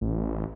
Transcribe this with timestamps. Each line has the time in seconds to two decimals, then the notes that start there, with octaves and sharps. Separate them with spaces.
0.01 A1